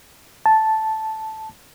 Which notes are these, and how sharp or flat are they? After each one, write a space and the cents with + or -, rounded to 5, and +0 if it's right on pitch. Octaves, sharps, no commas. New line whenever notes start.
A5 -5